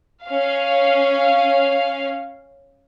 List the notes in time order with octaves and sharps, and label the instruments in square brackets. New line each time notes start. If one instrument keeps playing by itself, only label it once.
[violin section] C#4 F5